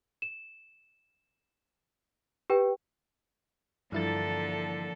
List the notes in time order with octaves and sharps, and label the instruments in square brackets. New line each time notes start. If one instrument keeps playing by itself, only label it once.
[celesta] E7
G4 B4 G5
[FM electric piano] G2 E4 A6 [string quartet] D3 A4 [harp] E3 F3 A#3